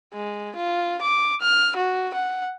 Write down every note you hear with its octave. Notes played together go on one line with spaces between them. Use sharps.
G#3
F4
D6
F6
F#4
F#5